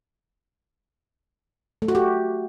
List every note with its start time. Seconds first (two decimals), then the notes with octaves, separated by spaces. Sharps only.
1.82 A3
1.88 F#4
1.95 G4